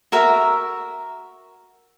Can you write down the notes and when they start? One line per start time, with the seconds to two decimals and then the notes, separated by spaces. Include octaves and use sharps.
0.12 F#4 A#4 E5